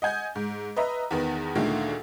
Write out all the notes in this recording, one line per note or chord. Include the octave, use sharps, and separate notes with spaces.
D#5 F#5 G#5 G6
G#2
B4 D#5 E5 A#5
E2 D#3 B3
D2 A#2 D3 D#3 G#3 A3